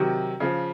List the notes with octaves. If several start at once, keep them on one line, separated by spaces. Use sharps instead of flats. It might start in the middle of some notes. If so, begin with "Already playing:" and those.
Already playing: C3 D#3 F#3
C#3 F3